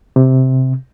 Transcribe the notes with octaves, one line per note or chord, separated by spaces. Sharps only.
C3